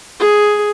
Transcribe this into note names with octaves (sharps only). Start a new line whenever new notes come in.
G#4